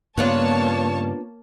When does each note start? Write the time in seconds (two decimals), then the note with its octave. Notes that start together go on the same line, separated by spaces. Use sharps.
0.18 G2 C#3 A#3 B3 D4 F4 C#5 A5